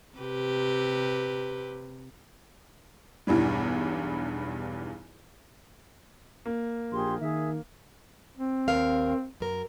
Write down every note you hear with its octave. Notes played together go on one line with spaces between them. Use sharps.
C3 G4 B4
B1 E2 G2 E3 G3
A#3
A#1 G4 G#4 C6
D#3 G#4 E5
C4
D#2 A#4 F5
F#2 A#4